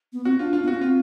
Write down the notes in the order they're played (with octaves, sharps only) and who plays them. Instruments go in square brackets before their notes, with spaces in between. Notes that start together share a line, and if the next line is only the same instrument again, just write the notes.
[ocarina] B3
[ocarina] C4 [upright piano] F#4
[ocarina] D4 [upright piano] F4
[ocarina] D4 [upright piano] F4
[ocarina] B3
[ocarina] C#4 [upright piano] F#4
[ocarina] C4 [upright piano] F4